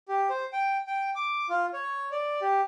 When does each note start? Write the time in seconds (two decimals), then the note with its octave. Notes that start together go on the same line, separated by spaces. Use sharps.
0.08 G4
0.29 C5
0.53 G5
0.87 G5
1.15 D6
1.49 F4
1.73 C#5
2.12 D5
2.41 G4